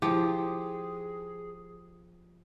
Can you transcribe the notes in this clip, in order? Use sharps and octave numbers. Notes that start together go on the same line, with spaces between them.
F3 E4 G4 G#4